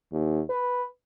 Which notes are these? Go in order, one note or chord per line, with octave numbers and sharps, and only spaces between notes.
D#2
B4